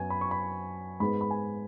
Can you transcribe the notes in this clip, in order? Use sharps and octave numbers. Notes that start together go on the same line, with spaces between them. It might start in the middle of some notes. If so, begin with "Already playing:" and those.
Already playing: F#2 F#3 B3 G#5
B5
C#6
B5
G#2 G#3 B3 B5
B5
G#5